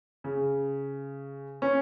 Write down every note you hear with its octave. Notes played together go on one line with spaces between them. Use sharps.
C#3
C#4